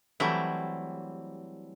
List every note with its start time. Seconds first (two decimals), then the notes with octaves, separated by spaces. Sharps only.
0.20 E3 F#3 G3 A3 C4 E4